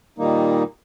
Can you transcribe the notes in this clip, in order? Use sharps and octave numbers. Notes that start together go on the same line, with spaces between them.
A#2 D#3 G3 A#3 D#4